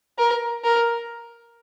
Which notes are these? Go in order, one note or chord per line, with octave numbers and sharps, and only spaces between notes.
A#4
A#4